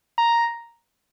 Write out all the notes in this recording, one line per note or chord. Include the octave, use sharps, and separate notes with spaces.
A#5